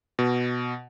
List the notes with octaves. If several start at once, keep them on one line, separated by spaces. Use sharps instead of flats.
B2